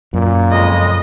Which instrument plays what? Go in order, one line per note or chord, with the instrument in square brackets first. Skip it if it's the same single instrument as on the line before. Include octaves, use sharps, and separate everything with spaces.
[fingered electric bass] F#2 [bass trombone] A#2
[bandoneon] F2 C#3 G#3 [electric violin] D#5